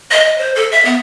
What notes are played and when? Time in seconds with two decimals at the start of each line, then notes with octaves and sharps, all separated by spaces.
0.11 D#5
0.26 D#5
0.38 C5
0.56 A4
0.72 E5
0.85 B3